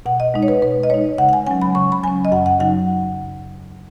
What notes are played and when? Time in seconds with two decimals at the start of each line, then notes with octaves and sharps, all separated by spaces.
0.06 B2 F#5
0.20 D#5
0.34 G#3 D#4
0.43 C#5
0.48 B4
0.62 B2 B4
0.83 D#5
0.90 G#3 D#4 C#5
1.18 C#3 F#5
1.29 F#5
1.33 G#5
1.47 F#3 C#4 G#5
1.62 B5
1.75 C#3 C#6
1.92 B5
2.03 F#3 C#4 G#5
2.25 D#5
2.32 F#2 F#5
2.46 F#5
2.60 C#3 F#3 D#4 F#5